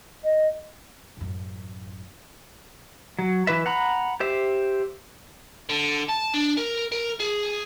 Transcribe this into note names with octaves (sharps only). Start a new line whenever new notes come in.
D#5
A1 F#2
F#3
E3 B4 E5
F#5 A#5 B5
G4 C5 E5
D3
A5
D4
A#4
A#4
G#4